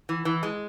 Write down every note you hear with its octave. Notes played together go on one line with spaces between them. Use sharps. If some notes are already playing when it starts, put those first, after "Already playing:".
E3
E3
G#3